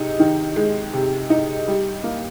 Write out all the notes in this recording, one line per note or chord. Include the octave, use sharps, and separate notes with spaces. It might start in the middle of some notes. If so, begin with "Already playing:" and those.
Already playing: C3 G#3 D#4
D#3
G#3
C3
D#4
G3
A#3